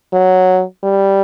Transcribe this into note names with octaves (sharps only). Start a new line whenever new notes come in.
F#3
G3